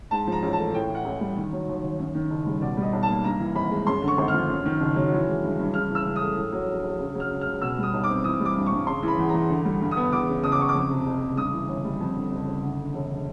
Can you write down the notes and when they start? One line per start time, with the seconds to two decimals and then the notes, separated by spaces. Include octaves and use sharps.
0.11 G#2 A5
0.27 F3 A#5
0.43 A1
0.53 A5
0.58 A3
0.74 A2 G5
0.90 E3
0.95 F#5
1.05 A1
1.21 G3
1.37 D#3
1.52 F#3
1.68 D#2
1.83 D#2
1.99 F#2
2.15 D#3
2.30 F#1
2.46 G3
2.61 B2 D5
2.77 G3
2.82 D#5
2.93 B1
3.03 A5
3.08 A#3
3.24 G2 A#5
3.40 E3
3.55 G#1 B5
3.71 G#3
3.87 F#2 C6
4.02 D3
4.08 C#6
4.18 G#1
4.28 F6
4.34 F3
4.49 F#2
4.65 D#3
4.81 F#1
4.96 F#3
5.12 E3
5.28 G#3
5.43 G2
5.59 G2
5.74 C#3 F6
5.90 E3
5.95 E6
6.05 C#2
6.16 D#6
6.21 A3
6.37 A2
6.52 F#3
6.68 A#1
6.84 A#1
7.00 C#3
7.15 F#3
7.20 F6
7.31 C#2
7.41 C#2 F6
7.62 B2 E6
7.78 G3 D#6
7.94 B1
8.04 D6
8.10 C4
8.24 E3 D#6
8.40 G3
8.45 D6
8.56 G2
8.66 C#6
8.72 G2
8.87 C#3 C6
9.03 E3
9.08 B5
9.19 E2
9.29 E2 A#5
9.50 D3
9.65 G3
9.81 G2
9.91 D#6
9.97 B3
10.12 E2 D6
10.28 C#3
10.43 F#1 D#6
10.52 D6
10.59 F#1 C#6
10.69 D6
10.75 F2
10.90 C3
11.06 F#1
11.22 F#1
11.37 G2 D#6
11.53 E3
11.69 G1
11.85 G3
12.00 F2
12.15 D3
12.32 F#1
12.47 F#1
12.62 D2
12.78 D3
12.94 E1